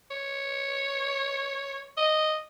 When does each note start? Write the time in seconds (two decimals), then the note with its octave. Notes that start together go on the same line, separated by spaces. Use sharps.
0.11 C#5
1.97 D#5